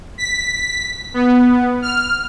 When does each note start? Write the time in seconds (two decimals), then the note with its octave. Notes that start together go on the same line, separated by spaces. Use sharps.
0.18 B6
1.14 B3
1.82 F6